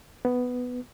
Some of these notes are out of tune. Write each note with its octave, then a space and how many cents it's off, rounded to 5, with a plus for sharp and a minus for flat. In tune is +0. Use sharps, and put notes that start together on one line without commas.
B3 +5